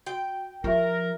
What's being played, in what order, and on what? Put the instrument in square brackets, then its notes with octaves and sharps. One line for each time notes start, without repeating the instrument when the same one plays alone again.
[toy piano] F#4 [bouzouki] G5
[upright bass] F3 [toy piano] F4 G4 E5 [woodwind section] A#4